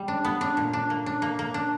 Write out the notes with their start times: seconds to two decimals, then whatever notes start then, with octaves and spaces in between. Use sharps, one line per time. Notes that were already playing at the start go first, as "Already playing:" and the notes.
Already playing: G3
0.08 D4
0.25 B3
0.41 D4
0.57 A#2
0.73 D4
0.90 A#3
1.06 D4
1.22 A#3
1.39 A#3
1.54 D4